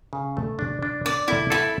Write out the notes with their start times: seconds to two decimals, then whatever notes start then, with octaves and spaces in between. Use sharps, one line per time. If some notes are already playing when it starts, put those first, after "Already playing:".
0.13 C#3
0.37 A3
0.59 D4
0.83 D4
1.05 D4 D5
1.28 E4 A4
1.50 E4 A4